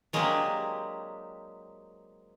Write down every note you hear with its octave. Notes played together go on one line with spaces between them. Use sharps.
F#3 G#3 A#3 C4 D4 G4